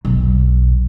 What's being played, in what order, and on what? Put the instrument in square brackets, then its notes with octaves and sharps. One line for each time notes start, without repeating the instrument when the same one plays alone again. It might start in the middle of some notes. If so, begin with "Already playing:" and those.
[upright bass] B1 E2